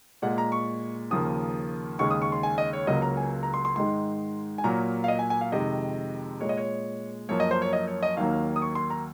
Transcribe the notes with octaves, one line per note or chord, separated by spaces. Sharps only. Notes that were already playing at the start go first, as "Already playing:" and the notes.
A#2 G#3 F#5
A#5
C#6
D#2 C#3 F3 A#3 D#6
D#2 C#3 G#3 C#6
D#6
C#6
C6
G#5
D#5
C#5
C#2 C#3 F#3 A#3 D#5
A#5
G#5
A#5
C6
C6
G#2 D#3 G#3 C6
G#5
A#2 F#3 A#3 A#5
F5
D#5
G#5
G#5
F5
F2 C3 D#3 G#3 D#5
A#2 G#3 C#5
D#5
C#5
F#2 F3 A#3 C#5
D#5
C5
C#5
D#5
C#5
D#5
D#2 D#3 F#3 A#3 F5
D#6
C#6
C6
A#5